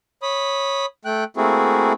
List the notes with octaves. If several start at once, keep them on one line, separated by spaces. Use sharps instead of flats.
C#5 B5 D#6
A3 G5 F#6
A3 A#3 C4 E4 F#4 G#4